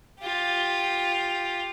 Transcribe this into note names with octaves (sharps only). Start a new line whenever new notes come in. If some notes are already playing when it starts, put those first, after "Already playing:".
F4 G4